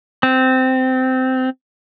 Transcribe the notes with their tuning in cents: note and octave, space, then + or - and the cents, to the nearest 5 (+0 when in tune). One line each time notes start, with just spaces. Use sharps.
C4 -15